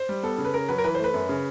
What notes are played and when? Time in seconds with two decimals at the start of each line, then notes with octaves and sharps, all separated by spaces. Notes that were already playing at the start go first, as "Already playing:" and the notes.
Already playing: C5
0.09 G3
0.23 B3 A4
0.38 C#3
0.45 B4
0.54 C#3 A#4
0.69 F#3 B4
0.78 A#4
0.84 E3 B4
0.95 C5
1.00 A3 B4
1.14 F#2
1.29 C#3